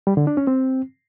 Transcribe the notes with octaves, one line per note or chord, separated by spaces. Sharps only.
G3
D3
D4
C#4
C4